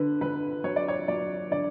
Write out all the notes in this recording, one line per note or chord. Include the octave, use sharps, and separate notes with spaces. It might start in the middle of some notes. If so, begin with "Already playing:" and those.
Already playing: D3 B4
D3 B4
F#3 C#5
D5
C#5
F#3 D5
D3 D5